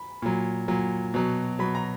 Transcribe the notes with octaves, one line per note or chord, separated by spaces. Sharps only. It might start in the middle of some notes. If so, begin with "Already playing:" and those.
Already playing: B5
A#2 F#3
A#2 F#3
B2 F#3
B2 F#3 B5
A#5